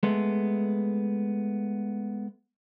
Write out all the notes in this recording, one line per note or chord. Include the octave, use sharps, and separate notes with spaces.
G#3 A3 B3